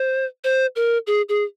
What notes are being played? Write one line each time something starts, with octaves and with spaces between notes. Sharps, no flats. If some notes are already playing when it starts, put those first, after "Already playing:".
Already playing: C5
C5
A#4
G#4
G#4